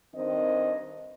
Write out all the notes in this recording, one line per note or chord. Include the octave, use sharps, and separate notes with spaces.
G2 D#3 C4 C5 D#5